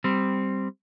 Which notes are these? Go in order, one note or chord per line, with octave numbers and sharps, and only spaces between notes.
G3 C4